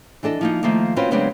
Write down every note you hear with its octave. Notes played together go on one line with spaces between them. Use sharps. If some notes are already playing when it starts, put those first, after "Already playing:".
E3 D4 A4 D#5
F3 A#3 D#4
D#3 F3 A3 A#3
C4 C#4 F4 F#4 B4
C#3 F#3 G#3 B3 C4 D4